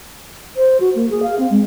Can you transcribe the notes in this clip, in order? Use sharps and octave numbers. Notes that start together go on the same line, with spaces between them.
C5
F#4
A#3
G#4
F5
C4
G#3